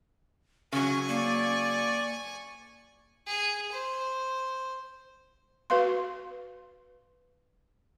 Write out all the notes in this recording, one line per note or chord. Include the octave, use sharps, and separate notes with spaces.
C#3 F#3 C#4 G#5 C#6
A#3 D5
G#4
C5
F#4 B4 F5 C6